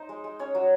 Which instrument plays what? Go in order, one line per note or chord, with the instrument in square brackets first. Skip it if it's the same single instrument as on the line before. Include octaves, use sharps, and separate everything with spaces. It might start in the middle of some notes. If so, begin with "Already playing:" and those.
Already playing: [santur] D#4 C5
G#3
G#3
C#4 C#5
F#3